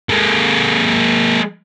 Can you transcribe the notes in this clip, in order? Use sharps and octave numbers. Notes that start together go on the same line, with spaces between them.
G#3 A#3